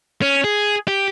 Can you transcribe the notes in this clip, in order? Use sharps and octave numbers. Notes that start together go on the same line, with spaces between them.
C#4
G#4
G4